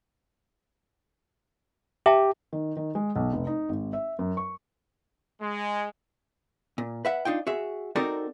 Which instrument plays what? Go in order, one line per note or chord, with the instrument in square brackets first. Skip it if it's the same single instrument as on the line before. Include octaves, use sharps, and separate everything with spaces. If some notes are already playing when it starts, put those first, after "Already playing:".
[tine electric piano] G4 [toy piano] E5 A5
[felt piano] D#3
D#3
G#3
B1
F1
D#4
G#1
E5
F#2
C#6
[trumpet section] G#3
[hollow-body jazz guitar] A#2
B4 E5 F#5
D4 D#4 F4 G5
F#4 G#4 E5
C4 D#4 F#4 A4 A#4 D5